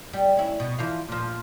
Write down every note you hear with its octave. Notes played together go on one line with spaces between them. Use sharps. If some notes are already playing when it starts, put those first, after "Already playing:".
G3
C#4 E4
B2
E3 F3 F5
A#2 F3